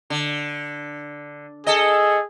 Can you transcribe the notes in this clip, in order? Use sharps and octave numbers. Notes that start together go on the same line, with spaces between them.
D3
G#4 A4 D#5